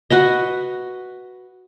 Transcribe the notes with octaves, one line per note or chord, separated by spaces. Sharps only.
F#4 B4 D#5